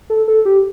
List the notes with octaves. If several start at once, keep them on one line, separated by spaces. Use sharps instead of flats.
A4
A4
G4